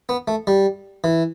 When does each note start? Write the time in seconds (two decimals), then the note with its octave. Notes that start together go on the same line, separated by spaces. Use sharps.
0.09 B3
0.28 A3
0.47 G3
1.04 E3